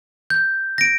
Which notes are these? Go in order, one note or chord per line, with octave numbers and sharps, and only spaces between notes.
G6
A#6 D7